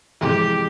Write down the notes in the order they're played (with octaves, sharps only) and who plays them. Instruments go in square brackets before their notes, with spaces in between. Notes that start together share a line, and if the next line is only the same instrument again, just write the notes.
[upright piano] F2 C3 E3 G#3 [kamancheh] G4